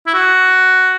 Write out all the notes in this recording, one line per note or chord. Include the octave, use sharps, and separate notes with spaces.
E4
F#4